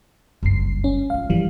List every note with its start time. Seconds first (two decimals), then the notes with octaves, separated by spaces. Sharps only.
0.43 F#1 C#2 G2 C7
0.84 C#4
1.10 A1 F4 F5
1.30 G2 E3 F3 G3